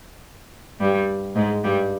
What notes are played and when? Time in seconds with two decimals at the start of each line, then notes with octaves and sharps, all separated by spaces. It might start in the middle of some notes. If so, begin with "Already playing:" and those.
0.80 G2 G3
1.36 G#2 G#3
1.64 G2 G3